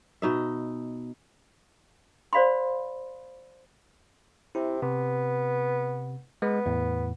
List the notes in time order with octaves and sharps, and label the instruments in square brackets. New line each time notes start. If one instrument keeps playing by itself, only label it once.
[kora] B2 D#4 E5
[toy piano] C5 D5 F5 B5 C6
[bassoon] C3 [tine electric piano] E4
[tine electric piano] C3 [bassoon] B3
[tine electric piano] G#3 [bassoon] B3
[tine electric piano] E2 A2